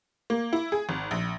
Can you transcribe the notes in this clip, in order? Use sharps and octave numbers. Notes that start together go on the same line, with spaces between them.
A#3
E4
G#4
G#1
A#1